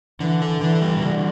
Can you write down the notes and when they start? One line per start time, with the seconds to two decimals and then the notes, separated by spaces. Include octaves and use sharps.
0.20 D3 E3
0.42 A4
0.61 E3 D4
0.81 G3
1.01 D3 E3